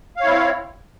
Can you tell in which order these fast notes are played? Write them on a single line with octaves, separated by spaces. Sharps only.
F5 C#5 E4 C4